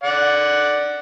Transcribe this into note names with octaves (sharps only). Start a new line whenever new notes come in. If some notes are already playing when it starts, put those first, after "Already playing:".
D5 F#5